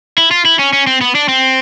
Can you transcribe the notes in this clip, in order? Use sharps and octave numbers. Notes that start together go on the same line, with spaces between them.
E4
F4
E4
C#4
C#4
C4
B3
D4
C4